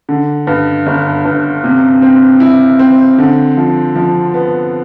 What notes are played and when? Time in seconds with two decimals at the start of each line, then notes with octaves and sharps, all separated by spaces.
0.09 D3
0.47 G2
0.86 G1
1.25 G2
1.64 C3
2.02 C4
2.40 E4
2.79 C4
3.18 D3
3.57 F3
3.96 F3
4.34 B3